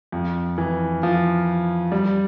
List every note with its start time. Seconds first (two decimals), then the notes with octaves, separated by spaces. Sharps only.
0.12 F2
0.58 E3
1.03 F3
1.92 G3